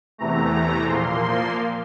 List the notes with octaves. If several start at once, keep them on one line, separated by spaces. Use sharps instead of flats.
E2 C3 E3 A3 A#5
A#2 F3 A#3 C6